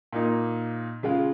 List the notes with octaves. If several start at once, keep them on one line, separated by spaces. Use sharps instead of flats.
A#2 A#3 D#4
C#3 G#3 F4